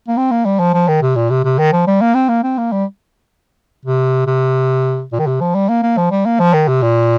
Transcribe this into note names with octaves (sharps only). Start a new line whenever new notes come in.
A#3
C4
A#3
G3
F3
F3
D#3
C3
A#2
C3
C3
D#3
F3
G3
A#3
C4
A#3
C4
A#3
G3
C3
C3
A#2
D#3
C3
F3
G3
A#3
A#3
F3
G3
A#3
F3
D#3
C3
A#2